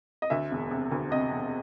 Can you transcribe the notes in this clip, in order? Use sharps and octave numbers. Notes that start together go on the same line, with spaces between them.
D#5
D2 E5
E1
C3
D2
C3 D#5
E1